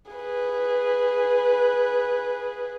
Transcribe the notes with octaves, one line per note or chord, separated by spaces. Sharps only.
G#4 B4